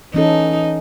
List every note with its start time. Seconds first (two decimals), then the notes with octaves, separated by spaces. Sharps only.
0.14 E3 C#4 D#4 A4